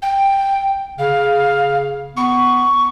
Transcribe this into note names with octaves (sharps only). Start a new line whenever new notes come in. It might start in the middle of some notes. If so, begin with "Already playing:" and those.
G5
C#3 F5
B3 C#6